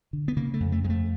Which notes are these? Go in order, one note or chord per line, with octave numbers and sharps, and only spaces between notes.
D3
B3
C#3 A#3
A3
F2
A3
F2 G#3
A3